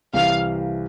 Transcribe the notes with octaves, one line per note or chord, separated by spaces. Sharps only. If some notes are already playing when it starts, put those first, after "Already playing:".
C2 C3 E3 F5